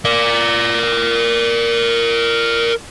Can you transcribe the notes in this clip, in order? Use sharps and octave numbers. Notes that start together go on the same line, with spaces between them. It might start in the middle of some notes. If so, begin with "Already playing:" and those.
A#4 D5